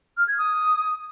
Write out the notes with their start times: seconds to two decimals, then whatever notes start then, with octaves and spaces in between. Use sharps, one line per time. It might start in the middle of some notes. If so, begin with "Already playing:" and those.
0.17 F6
0.28 G#6
0.38 D#6